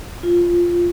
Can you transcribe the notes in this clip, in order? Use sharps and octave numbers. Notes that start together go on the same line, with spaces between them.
F4